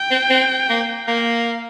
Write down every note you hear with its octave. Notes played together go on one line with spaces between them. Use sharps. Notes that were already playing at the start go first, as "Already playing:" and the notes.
Already playing: G5
C4
C4
A#3
A#3 F5